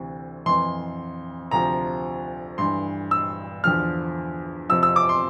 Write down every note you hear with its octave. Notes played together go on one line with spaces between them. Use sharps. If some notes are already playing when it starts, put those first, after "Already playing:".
Already playing: D2 C3 E3
F2 E3 C6
D2 C3 F3 A#5
G2 E3 C6
E6
E2 D3 F3 F6
F2 C3 F3 E6
E6
D6
C6